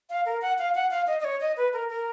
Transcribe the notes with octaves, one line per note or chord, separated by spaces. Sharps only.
F5
A#4
F#5
F5
F#5
F5
D#5
D#5
C#5
D#5
B4
A#4
A#4